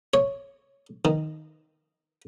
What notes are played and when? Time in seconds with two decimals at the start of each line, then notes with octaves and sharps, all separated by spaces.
0.14 C#5
1.05 D#3